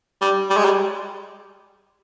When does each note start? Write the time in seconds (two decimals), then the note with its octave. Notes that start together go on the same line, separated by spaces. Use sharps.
0.21 G3
0.50 G3
0.57 G#3
0.65 G3